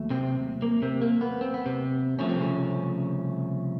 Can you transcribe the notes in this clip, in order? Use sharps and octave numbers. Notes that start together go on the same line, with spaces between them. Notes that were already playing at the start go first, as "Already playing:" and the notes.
Already playing: D#2 F#3 A3
C3 C4
A#3
C3 C4
A#3
B3
C4
B3
C3 C4
C2 C3 F3 A3 C#4
C4
C#3 C#4